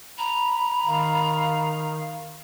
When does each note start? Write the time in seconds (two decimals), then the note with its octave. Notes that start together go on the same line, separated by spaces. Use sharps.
0.19 A#5 B5
0.86 D#3 F5